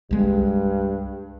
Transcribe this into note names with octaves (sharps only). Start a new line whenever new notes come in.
C2 G2 G#3